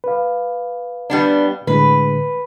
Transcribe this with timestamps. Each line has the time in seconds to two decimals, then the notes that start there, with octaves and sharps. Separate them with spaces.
0.04 B4 F5
1.10 G3 B3 D4
1.67 A2 D3 G#3 B4